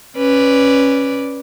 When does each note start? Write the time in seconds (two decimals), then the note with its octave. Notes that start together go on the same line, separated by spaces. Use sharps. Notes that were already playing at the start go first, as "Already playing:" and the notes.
0.17 C#4 B4 D5